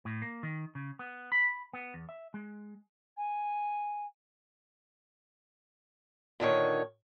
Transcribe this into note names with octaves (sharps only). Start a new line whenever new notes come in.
A2
A#3
D#3
C#3
B3
B5
B3
E2
E5
G#3
G#5
A#2 D3 D#3 C#5